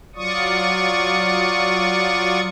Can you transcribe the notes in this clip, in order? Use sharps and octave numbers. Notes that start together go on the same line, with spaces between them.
F#3 F4 D5 C#6 D#6